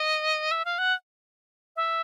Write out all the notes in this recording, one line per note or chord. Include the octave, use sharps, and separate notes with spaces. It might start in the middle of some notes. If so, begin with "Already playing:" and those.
Already playing: D#5
E5
F5
F#5
E5